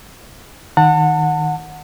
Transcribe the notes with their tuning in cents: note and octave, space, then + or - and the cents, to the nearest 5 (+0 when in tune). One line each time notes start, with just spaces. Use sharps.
D#3 +0 F#5 -15 A5 +35